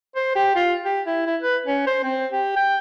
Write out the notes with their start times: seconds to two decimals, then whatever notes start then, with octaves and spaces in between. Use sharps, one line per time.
0.16 C5
0.36 G4
0.56 F4
0.85 G4
1.07 E4
1.27 E4
1.42 B4
1.66 C#4
1.87 C5
2.04 C4
2.32 G4
2.56 G5